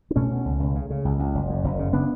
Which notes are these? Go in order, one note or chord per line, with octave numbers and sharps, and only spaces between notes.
D4
B2 A3 C#4
B2
C#2
C#2
C#3
C#3
C#2
C#2
F#1
F#2
F#1
C#3
C#3 B3 D4